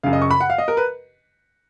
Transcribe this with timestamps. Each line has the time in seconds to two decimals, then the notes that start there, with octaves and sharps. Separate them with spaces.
0.03 F#2 C#3 F5
0.13 D#5
0.22 C#6
0.31 B5
0.40 F#5
0.50 F5
0.58 D#5
0.68 A#4
0.77 B4